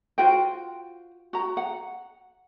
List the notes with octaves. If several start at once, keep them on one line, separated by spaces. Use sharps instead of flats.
F4 F#4 C5 G5
F#4 A#5
F#5